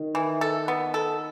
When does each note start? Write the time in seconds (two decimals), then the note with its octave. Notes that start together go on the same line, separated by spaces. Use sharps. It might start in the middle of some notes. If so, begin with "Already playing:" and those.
Already playing: D#3
0.15 E3
0.41 A4
0.68 B3
0.94 A4